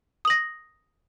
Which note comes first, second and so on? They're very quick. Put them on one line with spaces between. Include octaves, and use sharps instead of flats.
D#6 F#7 A#6